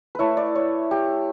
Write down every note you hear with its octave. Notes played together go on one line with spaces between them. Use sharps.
A3 E4 B4 C#5
D5
C#5
G4